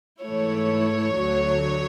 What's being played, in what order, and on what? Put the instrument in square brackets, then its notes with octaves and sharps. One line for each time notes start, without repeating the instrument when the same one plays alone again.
[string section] G#2 E3 A3 E4 C#5
D2 D3 F#3 A3